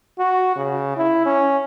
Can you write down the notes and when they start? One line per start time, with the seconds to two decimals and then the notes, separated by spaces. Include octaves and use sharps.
0.19 F#4
0.56 C#3
0.97 E4
1.26 C#4